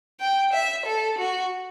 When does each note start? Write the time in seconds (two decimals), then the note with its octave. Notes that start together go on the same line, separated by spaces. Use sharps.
0.20 G5
0.53 E5
0.86 A4
1.18 F#4